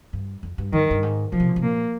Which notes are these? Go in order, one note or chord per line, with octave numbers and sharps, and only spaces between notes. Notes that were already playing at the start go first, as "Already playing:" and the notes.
G2
F2
G2
G2 D#3
G2
G#2
A#2 F3
C3
A#2
C3
A#2 A#3